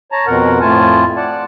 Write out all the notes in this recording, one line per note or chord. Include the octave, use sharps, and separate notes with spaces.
C#5 A5 A#5
F2 B2 A#4 F#5
F2 A2 A3 F4 G#5 A5
D5 F#5 A5